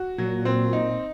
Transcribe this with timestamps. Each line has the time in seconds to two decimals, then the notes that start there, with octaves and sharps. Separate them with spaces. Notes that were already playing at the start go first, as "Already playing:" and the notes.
Already playing: F#4
0.18 A#2 F#3
0.45 C4
0.73 D#4